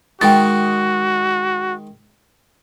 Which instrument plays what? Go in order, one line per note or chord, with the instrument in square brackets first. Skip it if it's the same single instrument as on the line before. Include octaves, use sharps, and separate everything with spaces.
[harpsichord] D#3 G#3 [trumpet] F#4 [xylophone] G5 A6